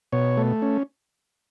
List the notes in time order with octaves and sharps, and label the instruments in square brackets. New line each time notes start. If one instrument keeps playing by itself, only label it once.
[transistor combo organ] B2 C#5
A3
C#4